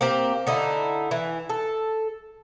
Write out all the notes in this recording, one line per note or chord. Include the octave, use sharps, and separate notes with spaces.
A#3 C4 G4
D3 D#4 E4
E3
A4